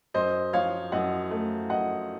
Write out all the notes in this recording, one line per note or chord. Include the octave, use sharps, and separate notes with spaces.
F#2 C5 D#5
F3 C#5 F5
F#2 D#5 F#5
A3
F#2 D#5 F#5